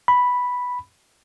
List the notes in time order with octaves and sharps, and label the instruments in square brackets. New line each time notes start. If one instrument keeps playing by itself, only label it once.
[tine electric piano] B5